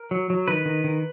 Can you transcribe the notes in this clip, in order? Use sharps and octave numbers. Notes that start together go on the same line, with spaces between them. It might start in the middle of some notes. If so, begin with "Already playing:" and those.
Already playing: A#4
F#3
F#3
D#3 B4
D#3
D#3